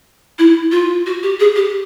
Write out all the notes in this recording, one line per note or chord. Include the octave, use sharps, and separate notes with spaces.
E4
F4
F#4
G4
G#4
G4